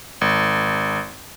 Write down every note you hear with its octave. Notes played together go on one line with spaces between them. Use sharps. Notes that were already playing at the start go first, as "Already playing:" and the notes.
G#1